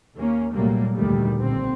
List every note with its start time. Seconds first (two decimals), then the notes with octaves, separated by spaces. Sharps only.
0.15 D#2 A#3 C#4
0.53 C2 A#2 F#3 G3 A3 A#3
0.95 F1 D2 A#2 D#3 G3 A3
1.39 B1 A#2 D3 C4